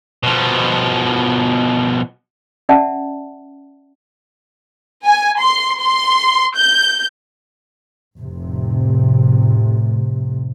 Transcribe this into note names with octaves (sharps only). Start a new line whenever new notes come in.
B2 F3
C#4 D5 E5 F#5 A5
G#5
C6
C6
G6
F1 A2 C3